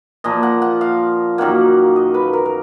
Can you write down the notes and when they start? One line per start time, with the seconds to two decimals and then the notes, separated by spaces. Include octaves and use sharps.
0.24 A#2 F3 A#3 D#5
0.43 F#5
0.62 F#5
0.81 F5
1.38 F#2 D#3 A#3 F#5
1.96 D#5
2.14 B4
2.33 A#4
2.45 A#4